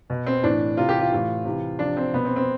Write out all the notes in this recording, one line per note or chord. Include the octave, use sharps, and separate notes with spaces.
B2
C4
A2 E3 D4
C3 E3 F4
G4
F4
A2 E3
C3 E3
C3 F3 D4
C4
B2 B3
C4
C4